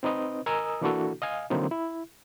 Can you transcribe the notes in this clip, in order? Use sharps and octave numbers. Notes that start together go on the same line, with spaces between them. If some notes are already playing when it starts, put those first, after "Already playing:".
C4 D#4 B4 D#5
A#4 D#5 G#5 A#5 D#6 E6
E3 A#3 D4 E4 F#4 A4
D#5 F5 G#5
D3 E3 F#3 A#3 C4 D#4
E4